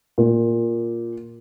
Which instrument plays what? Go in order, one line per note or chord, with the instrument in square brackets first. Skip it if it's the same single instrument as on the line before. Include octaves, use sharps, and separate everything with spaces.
[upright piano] A#2